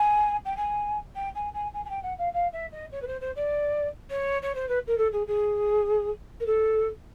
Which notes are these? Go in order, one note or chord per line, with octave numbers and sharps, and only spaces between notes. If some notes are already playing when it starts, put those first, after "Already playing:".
Already playing: G#5
G5
G#5
G5
G#5
G#5
G#5
G#5
G5
F#5
F5
F5
E5
D#5
C#5
B4
C5
C5
D5
C#5
C#5
C5
B4
A#4
A4
G#4
G#4
A#4
A4